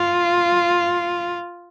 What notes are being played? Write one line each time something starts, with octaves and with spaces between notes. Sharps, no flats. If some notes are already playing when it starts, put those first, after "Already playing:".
Already playing: F4